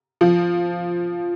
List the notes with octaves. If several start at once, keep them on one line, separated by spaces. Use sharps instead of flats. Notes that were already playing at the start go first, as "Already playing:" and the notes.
F3